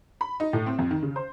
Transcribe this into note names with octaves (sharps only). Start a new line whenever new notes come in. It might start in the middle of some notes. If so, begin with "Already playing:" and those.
B5
D#4
A2
C4
F2
D#3
C#3
C5